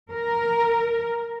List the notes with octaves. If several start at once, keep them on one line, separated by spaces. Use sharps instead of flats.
A#4